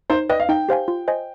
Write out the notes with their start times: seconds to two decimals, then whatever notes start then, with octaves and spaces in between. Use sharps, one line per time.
0.10 D#4 C5
0.30 B4 D5 D#5 G5
0.40 F5
0.49 D#4 G5
0.69 G4 C5 F5 G#5
0.88 F4
1.08 C5 D#5 G#5